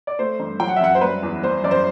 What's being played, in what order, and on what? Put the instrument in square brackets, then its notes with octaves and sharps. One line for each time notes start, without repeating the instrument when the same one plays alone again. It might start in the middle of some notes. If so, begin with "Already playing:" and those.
[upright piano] D5
A3 C5
G2
F#3 G5
F#5
E5
F#2 F#5
C5
G3 B4
E2
G3 C5
F#2 D5
C5